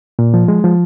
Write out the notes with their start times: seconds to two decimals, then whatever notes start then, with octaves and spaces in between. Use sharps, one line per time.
0.19 A#2
0.34 F3
0.48 G#3
0.64 F3